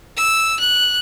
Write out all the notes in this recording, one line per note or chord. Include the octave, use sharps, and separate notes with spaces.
E6
F#6